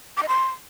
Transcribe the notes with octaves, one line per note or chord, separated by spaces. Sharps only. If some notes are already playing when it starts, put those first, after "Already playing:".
D6
D#5
C6